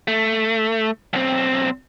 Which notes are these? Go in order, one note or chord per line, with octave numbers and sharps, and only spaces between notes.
A3
B1 C4